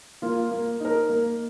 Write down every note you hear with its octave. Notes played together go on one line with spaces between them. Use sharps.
A#3 F4
A#3
D#4 A#4
A#3